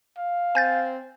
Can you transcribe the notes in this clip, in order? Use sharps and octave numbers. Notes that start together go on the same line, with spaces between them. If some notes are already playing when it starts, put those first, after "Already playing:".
F5
C4 G#5 G6 A6